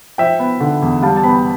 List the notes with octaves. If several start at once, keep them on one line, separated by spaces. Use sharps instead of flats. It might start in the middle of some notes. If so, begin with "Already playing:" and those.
F3 E5 G5
B3
D3
E2
G3 F5 A5
A5
B3 G5 B5